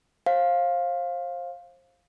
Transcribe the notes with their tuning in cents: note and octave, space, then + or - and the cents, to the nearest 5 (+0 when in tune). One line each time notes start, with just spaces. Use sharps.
C5 +30 F5 +5